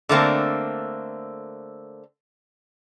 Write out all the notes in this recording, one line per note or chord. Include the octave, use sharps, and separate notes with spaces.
D3 A3 A#3 C4